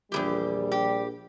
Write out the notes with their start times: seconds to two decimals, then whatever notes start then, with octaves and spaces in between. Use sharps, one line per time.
0.12 A#1 E2 E3 G3 G4
0.72 G4